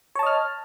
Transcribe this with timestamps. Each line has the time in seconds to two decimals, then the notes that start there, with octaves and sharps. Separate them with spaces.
0.15 C#5
0.19 A5
0.23 D#5
0.26 F6